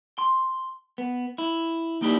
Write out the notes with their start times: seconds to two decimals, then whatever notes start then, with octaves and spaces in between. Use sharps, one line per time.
0.19 C6
0.98 B3
1.38 E4
2.02 A#3 D#4 E4 G4 D5